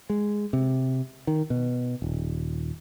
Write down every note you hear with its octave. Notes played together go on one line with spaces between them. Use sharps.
G#3
C3
D#3
B2
D#1